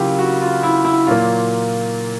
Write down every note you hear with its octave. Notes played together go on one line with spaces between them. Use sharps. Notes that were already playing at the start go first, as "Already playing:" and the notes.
Already playing: C#3 F#3 A#3 E4 F4 G4
F#4
F4
E4
E4
A#2 F#3 A#3 F4